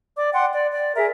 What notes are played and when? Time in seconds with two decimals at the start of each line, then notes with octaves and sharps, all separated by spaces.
0.16 D5 D6
0.33 F#5 G5 C6
0.53 D5
0.71 D5
0.95 G#4 A#4 E5